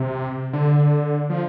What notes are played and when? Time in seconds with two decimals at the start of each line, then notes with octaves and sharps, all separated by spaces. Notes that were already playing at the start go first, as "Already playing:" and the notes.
Already playing: C3
0.53 D3
1.30 F3